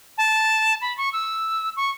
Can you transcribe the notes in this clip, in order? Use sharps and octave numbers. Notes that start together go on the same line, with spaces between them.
A5
B5
C#6
E6
C#6